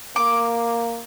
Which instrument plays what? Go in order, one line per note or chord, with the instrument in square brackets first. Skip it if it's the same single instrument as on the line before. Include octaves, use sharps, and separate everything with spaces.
[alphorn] A#3 [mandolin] D6